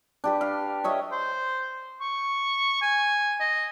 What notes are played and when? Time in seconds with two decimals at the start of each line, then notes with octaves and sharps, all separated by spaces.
0.24 D4 G4 B4
0.41 F5
0.84 C#5 D#5 E5
1.12 C5
2.01 C#6
2.82 G#5
3.40 D#5